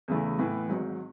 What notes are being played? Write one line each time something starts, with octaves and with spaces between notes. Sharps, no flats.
E2 C#3 E3 A3
A2 E3 B3
G#1 G#2 F#3